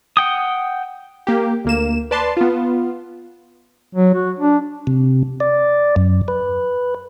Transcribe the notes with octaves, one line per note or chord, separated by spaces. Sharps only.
F#5 G5 D#6
A#3 G4
D2 A#3 E7
B4 D5 A5 C6
B3 F4
F#3
F#4
D4
C3
D5
F#2
B4